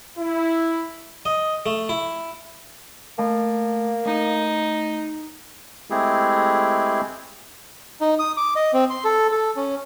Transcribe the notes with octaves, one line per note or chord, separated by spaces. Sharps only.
E4
D#5
A3
E4
A3 A#3 A5
A3 D#4
G#3 A3 C4 E4 G4 G#4
D#4
D#6
D6
D#5
C4
C6
A4
A4
C#4